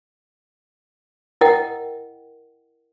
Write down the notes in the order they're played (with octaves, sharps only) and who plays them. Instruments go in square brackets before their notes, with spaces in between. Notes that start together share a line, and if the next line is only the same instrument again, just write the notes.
[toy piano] E4 A#4 D#5 F#5 G5